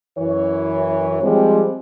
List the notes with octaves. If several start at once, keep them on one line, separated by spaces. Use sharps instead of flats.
F#2 E3 C#5
F3 G3 G#3 C4